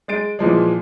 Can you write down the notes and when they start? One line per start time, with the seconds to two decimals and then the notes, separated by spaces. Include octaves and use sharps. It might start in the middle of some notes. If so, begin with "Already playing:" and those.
0.08 G#3 A6 D7
0.39 A#2 E3 F3 G#3